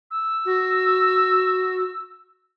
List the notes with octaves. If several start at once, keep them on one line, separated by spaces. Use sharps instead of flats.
E6
F#4